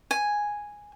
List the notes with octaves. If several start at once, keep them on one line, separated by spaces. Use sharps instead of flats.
G#5